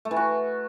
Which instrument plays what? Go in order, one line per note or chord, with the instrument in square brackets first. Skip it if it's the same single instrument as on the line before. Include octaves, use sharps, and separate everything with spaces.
[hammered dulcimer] A3
E3
F#4